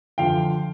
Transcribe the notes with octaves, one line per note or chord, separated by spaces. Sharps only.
D3 F3 F5 G5